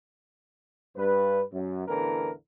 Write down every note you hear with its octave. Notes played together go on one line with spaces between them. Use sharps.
G2 B4
F#2
A1 E2 D3 E3 A#4